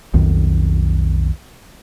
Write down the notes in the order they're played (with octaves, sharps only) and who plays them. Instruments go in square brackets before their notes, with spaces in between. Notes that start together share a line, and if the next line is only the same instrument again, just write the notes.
[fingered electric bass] B1 F2 D#3